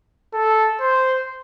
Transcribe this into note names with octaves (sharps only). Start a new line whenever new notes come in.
A4
C5